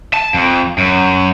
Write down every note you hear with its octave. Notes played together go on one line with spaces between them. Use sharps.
A5
F2
F#2